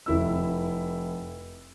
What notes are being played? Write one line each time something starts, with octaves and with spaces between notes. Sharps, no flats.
F1 E4 E6